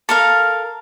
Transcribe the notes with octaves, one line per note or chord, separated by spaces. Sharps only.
A4 A#4 F5